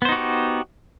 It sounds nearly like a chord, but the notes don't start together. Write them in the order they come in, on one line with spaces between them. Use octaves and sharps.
B3 C5 D#4 F#4 G4